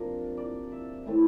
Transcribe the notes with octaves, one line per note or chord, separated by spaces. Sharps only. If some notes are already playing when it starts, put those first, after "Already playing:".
Already playing: C3 F3 A#3 D4 A#4
D5
E5
A2 E3 A3 C4